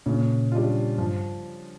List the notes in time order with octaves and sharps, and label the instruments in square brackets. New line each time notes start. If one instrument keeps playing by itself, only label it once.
[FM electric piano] A#2 [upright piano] C#3
[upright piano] G3 D4 F4
[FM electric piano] G2 [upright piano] F3